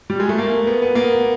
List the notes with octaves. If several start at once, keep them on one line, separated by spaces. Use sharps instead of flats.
G3
G#3
A3
A#3
B3
B3
A#3